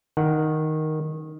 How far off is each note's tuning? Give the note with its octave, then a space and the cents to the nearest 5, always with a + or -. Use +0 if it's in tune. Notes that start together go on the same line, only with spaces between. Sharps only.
D#3 +0 F#5 +0